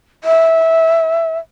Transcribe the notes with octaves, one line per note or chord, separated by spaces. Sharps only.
E5